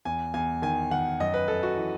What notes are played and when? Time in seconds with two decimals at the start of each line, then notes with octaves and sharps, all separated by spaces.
0.05 E2 G#5
0.34 E2 G#5
0.62 D#3 G#5
0.91 D#3 F#5
1.20 F#2 D#5
1.34 B4
1.48 F#2 A4
1.63 F#4
1.77 E3